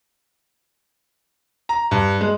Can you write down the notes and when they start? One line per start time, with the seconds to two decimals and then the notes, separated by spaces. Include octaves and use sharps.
1.69 A#5
1.91 G2
2.21 G#3